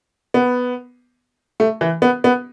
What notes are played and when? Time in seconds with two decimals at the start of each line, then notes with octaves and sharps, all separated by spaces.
0.34 B3
1.60 A3
1.81 E3
2.02 B3
2.24 B3